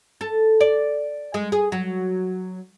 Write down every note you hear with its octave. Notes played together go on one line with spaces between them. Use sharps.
A4
D5
G#3
G#4
F#3